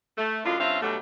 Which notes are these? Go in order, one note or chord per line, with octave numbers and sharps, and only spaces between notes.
A3
F#2 A2 G#3 D4 F4
G2 C4 C#4 F4 E5 F5
B2 D3 F#3 G3 A3